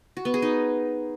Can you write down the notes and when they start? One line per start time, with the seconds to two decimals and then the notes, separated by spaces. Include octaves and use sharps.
0.17 F#4
0.25 B3
0.34 G#4
0.42 D#4